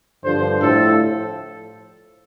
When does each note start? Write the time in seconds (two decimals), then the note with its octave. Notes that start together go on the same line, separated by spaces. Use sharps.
0.24 G2 D3 F3 C5
0.62 A2 F3 A4